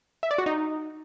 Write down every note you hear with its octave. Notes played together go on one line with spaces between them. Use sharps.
E5
D5
F#4
D#4